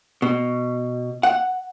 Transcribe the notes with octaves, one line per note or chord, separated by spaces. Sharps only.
B2
F#5